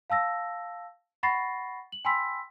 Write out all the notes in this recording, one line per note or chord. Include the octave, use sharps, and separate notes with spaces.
F5 A5 E6 A#6
F#5 B5 C#6 A6 A#6 C7
F#7
G5 G#5 B5 C6 E6 B6